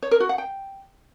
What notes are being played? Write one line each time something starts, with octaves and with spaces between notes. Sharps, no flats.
C#5
A#4
F#4
F#5
G5